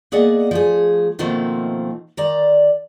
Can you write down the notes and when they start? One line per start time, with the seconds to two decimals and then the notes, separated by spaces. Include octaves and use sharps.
0.12 A#3 B3 G#4 D5 D#5 F#5
0.51 F3 A3 G#4
1.19 B2 D#3 F3 A3 A#3 C4
2.17 D#3 D5 A#5